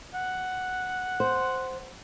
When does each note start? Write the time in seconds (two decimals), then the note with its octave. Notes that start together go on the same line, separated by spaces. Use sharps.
0.14 F#5
1.20 C5